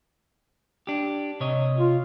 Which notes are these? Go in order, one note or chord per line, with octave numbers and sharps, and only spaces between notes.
D4 G4
C3 C#5 D#5
F4